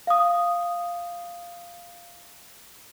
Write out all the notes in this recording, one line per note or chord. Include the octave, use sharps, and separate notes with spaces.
F5 D#6